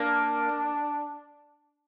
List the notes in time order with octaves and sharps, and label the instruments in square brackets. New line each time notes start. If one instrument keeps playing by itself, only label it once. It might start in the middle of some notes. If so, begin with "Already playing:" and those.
Already playing: [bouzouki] A#3 [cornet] D4